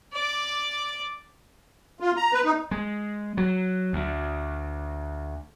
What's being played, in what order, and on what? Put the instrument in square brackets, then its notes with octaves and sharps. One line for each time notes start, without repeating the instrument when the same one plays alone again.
[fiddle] D5 D6
[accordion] F4
A#5
B4
D#4
[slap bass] G#3
F#3
D2